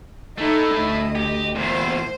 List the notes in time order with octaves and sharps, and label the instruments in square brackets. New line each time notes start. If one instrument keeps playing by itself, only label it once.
[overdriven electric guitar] A3 E4 [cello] D#4 A4
[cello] D2 D#5
[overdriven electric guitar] G4
[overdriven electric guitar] E2 A#2 [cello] C5